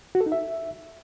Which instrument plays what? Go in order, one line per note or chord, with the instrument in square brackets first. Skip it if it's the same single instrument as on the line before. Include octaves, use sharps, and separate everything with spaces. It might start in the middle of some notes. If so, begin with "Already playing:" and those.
[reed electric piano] F#4
A4
D#4
E5